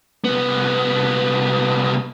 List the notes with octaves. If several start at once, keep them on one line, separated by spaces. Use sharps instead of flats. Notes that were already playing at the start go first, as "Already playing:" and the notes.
C2 B3